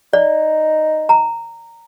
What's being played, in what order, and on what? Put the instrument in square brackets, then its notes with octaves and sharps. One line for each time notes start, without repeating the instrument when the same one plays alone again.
[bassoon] D#4 [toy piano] D5
[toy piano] A#5